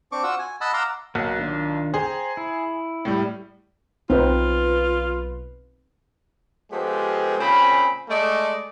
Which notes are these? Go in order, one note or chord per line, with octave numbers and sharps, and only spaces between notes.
C4 D4 C#6 D6
F4 F#4 F#5 C#6 E6
G#5
D#5 F#5 A5 B5 E6
F5 F#5 A#5 C6 D6 E6
B1 A#3 F#4 F#5
D#3 D4 F4
G#4 C5 G5 A#5
E4
A2 G3
B1 C4 D#4 F4 B4 C5
F3 G#3 B3 G4 A4 C5
A#2 C#3 C4 G#5 B5
G#3 A3 D5 D#5